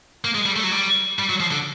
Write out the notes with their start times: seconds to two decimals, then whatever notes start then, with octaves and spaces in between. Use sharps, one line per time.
0.24 A#3
0.35 G#3
0.46 G3
0.56 A3
0.64 F#3
0.72 G3
1.19 G3
1.30 F#3
1.40 F3
1.51 D3